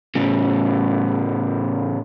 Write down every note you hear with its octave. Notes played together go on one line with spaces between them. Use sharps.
A2 C#3